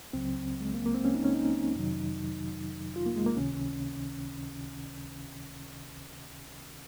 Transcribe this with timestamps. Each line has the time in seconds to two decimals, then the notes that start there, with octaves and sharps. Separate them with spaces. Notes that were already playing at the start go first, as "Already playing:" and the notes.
0.13 C#2 C#3 F#3 C4
0.60 G#3
0.74 A#3
0.86 A#3
0.94 C4
1.05 C#4
1.15 D#4
1.24 C#4
1.35 D#4
1.75 F2 C3 D#3 F#3
2.96 F4
3.06 A#3
3.16 G#3
3.26 A#3
3.36 C#2 C3 D#3 C#4